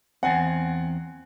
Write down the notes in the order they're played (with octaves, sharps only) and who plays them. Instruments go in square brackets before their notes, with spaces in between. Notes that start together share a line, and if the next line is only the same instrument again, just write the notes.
[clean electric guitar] E2 C4 [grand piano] F#5 G#5